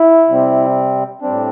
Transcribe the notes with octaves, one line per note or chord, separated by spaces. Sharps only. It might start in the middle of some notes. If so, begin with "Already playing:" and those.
Already playing: E4
C3 G3 C4
A2 G3 C4 D4